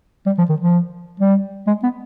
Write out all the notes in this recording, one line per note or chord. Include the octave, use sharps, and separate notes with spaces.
G3
F3
D#3
F3
G3
G#3
B3